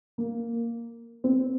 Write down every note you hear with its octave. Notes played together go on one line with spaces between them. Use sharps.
A#3
C4